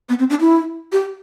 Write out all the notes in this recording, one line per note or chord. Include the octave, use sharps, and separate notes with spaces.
B3
C4
D4
E4
G4